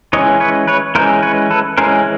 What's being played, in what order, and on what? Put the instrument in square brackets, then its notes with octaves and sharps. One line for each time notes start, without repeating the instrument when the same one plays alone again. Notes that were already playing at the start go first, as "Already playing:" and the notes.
[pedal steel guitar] E3 G#3 C#4 C#5 D#5
B4 C#5
B4 C#5
E3 G#3 C#4 A#4 C5
B4 C#5
A4 B4
E3 G#3 C#4 A#4 C5